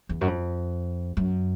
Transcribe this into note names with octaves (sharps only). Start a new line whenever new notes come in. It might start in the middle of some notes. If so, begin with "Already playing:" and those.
E2
F#2
F2
F#2